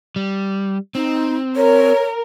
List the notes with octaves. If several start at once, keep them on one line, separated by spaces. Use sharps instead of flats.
G3
C4 D#4
A#4 C#5